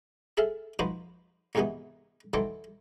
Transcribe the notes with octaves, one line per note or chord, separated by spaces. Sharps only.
G#4 A4 E5 F5
F3 D#4 F#4 B4 C5
C#2 G#2 C3 D#3 E3 B3
D#3 E3 F#3 A4 C5 D5